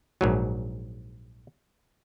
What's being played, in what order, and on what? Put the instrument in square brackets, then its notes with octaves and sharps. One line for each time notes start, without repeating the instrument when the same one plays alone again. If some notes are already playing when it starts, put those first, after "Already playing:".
[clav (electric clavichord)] A#1 G#2 F#3